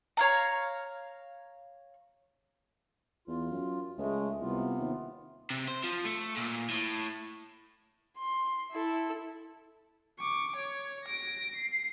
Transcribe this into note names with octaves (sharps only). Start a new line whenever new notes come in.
C#5 F5 A#5
E2 F4
F#2
C#2 G#3 A3
C2 C3 B3 F4
D#2
C3
C5
F3
A3
A#2
A2
C6
E4 A4
C#6 D6
C#5
A#6 D7
C7